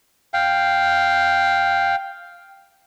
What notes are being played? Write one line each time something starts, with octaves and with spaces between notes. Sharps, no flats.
F5 G5